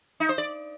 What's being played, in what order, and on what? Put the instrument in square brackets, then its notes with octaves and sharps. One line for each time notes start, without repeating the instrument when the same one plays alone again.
[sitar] D#4
C5
D5